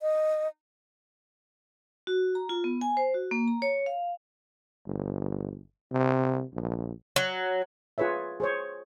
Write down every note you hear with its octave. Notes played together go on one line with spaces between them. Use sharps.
D#5
F#4
A#5
F4
B3
G#5
C5
F#4
A#3
A#5
C#5
F5
G1
C3
A#1
F#3
F4 G#4 B4 C#5 E5
G#4 C5 C#5